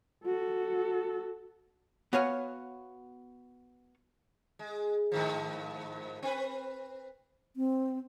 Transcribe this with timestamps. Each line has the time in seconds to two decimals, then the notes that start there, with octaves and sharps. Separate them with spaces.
0.25 F#4 A4
2.13 B3 F#4 C#5 F5 F#5 G#5
4.59 G#3
5.12 G#2 D#3 F3
6.23 C4 B4
7.56 C4